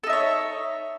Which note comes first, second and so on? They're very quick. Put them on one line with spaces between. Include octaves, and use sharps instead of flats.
A4 D#4 E5 C#5